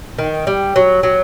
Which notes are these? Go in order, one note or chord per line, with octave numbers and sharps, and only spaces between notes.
D#3
G3
F#3
F#3